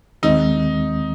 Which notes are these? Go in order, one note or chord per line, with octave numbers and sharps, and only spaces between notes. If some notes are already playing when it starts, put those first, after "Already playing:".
D#2 D#3 G#3 C4 D#4